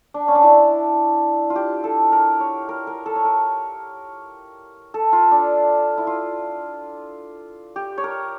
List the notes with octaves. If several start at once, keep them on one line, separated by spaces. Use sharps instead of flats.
D4
C#4
D4
E4
F4
G4
A4
A#4
C#5
A#4
A#4
A4
C#5
A#4
A4
F4
D4
E4
F4
G4
C#5
A#4